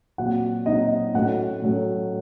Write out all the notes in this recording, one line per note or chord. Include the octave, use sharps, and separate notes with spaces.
A#2 F#3 C4 F#4 F#5
A#2 F#3 C4 D#4 D#5
A2 F#3 A3 C#4 F#4 F#5
A2 F#3 A3 C#4